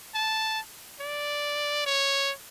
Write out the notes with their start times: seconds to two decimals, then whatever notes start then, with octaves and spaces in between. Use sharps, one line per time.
0.15 A5
1.01 D5
1.87 C#5